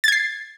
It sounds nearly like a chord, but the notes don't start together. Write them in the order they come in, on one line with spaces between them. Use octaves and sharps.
A6 G#6 C7